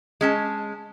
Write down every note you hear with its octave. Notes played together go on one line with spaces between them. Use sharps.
G#3 C#4 A5